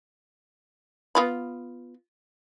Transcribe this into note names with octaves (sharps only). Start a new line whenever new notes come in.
B3 F4 B5